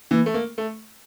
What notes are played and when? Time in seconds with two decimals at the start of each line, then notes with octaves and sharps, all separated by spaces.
0.11 E3 A#3
0.26 A3
0.34 A#3
0.58 A3